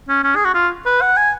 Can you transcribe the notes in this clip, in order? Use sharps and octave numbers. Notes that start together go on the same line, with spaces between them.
C#4
C#4
G#4
F#4
F4
B4
F#5
G#5